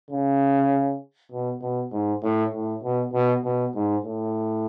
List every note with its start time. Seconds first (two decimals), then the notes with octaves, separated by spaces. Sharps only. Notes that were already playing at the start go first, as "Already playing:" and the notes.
0.11 C#3
1.32 B2
1.62 B2
1.92 G#2
2.23 A2
2.54 A2
2.84 B2
3.13 B2
3.44 B2
3.75 G#2
4.05 A2